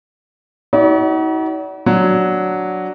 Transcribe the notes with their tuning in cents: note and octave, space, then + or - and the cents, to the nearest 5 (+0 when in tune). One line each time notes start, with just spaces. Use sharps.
D#4 +45 F#4 +30 D5 -40
F#3 +0 D4 +0